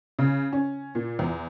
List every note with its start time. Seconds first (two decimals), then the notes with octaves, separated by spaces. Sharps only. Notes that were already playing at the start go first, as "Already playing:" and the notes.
0.19 C#3
0.53 C#4
0.95 A#2
1.19 E2